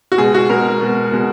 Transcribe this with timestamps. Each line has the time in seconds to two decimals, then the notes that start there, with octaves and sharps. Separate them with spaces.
0.12 F#4
0.18 B2 G#3 G#4
0.34 F#4
0.50 B2 G#3 A#4
0.81 B2 G#3
1.12 B2 G#3